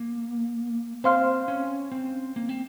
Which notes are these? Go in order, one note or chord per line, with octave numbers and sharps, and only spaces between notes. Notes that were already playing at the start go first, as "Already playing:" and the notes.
Already playing: A#3
C4 C5 F5 C6 F6
C#4
C4
A#3
C4